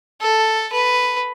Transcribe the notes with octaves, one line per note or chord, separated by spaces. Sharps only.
A4
B4